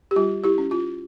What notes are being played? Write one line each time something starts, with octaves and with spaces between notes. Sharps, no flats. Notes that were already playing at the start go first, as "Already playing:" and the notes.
G4
G3 F4
E4 G4
C#4
F4